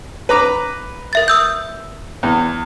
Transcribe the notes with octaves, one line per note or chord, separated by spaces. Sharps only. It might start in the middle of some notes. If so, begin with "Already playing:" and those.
B4 A#5 D6
A#4 E5 A6
D#6 E6 G6
E2